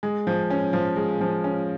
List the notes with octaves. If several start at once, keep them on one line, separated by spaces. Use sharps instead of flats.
G#3
F3
C#4
F3
G#3
F3
C#4